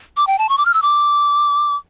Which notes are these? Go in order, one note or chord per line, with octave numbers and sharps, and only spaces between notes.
D6
G5
A5
C#6
D6
F6
E6
D6